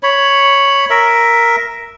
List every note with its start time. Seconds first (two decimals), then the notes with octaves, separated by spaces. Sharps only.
0.03 C#5 B5
0.90 A#4 E5